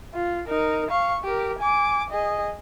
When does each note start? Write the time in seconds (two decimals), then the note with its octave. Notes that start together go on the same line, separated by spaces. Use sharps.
0.14 F4
0.48 D#4 A#4
0.90 F5 C#6
1.24 G4 A#4
1.59 G#5 D6
2.10 G#4 D#5